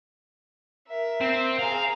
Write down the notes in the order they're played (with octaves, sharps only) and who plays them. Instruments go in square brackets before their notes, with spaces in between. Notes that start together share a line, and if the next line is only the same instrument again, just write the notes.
[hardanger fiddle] A#4 E5
[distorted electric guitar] C4
[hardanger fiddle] G#4 A#5 [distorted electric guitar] F5